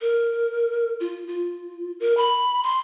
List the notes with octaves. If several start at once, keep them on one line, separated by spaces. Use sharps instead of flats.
A#4
F4
F4
A#4
B5
C6